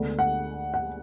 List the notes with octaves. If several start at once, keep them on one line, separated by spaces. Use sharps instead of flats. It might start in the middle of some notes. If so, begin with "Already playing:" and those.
Already playing: D2 D3 G#3 B3
F#5
F#5